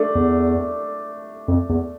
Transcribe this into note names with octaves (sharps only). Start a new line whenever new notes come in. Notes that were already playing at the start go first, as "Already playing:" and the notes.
Already playing: A3 D4
E2
F2
E2